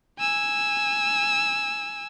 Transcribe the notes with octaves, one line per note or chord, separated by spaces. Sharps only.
G#5 E6